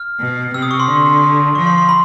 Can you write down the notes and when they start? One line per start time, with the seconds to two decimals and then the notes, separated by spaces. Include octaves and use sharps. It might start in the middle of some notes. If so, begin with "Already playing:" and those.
Already playing: F6
0.20 B2
0.54 C3 E6
0.62 D#6
0.71 C#6
0.80 C6
0.87 D3
1.55 F3 C#6
1.67 C6
1.78 C6
1.89 B5